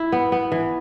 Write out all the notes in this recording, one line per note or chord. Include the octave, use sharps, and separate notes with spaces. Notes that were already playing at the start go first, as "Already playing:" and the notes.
Already playing: E4
B3
B3
E3